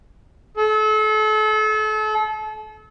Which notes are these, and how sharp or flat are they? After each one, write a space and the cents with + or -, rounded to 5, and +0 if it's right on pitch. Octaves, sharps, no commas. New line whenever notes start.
A4 -35